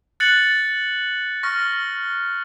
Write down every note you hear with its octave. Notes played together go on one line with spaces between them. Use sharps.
F#6 A6 C#7 F#7
C#6 F6 A#6